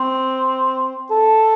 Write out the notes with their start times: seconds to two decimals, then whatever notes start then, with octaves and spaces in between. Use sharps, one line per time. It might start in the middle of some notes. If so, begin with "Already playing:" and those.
Already playing: C4
1.11 A4